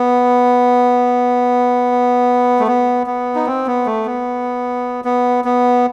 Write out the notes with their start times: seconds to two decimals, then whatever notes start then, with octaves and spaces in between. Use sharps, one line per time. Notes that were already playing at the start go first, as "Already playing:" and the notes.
Already playing: B3
2.60 A3
2.67 B3
3.07 B3
3.35 D#4
3.46 C4
3.67 B3
3.86 A3
4.05 B3
5.05 B3
5.45 B3